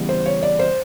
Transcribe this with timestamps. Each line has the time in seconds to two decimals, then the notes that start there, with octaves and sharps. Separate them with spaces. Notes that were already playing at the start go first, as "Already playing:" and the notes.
Already playing: C#3 E3 G3 B3
0.09 C5
0.26 C#5
0.43 D5
0.59 C5